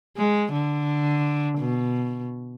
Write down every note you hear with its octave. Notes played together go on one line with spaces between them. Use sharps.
G#3
D3
B2